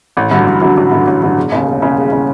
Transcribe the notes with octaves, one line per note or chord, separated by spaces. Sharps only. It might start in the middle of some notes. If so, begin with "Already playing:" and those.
A1
G2 D3 F#3
A1
G2 D3 F#3
A1
G2 D3 F#3
A1
G2 D3 F#3
E1
D#2 C#3
E1
D#2 C#3
E1
C#3